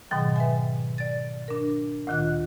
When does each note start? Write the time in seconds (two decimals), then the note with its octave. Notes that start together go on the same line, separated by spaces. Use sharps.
0.11 G#2 B2 D#3 F#3 G5
0.36 B4 E5 G#5
0.98 D5 A6
1.48 D4 A#4
2.07 D2 A#2 D#3 F4 F#6